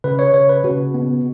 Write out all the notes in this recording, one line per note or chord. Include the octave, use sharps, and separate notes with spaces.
C#3 B4
C#5
C#3 C#5
B4
C#3 F#4
B3